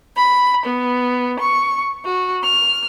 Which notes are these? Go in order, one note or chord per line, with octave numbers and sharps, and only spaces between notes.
B5
B3
C#6
F#4
F6